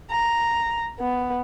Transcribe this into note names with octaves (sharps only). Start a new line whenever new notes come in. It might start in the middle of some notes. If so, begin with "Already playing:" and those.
A#5
B3